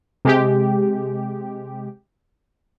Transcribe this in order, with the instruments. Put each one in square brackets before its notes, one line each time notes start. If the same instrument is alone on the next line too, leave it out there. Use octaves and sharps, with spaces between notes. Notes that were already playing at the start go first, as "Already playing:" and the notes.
[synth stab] C3 G#3 G4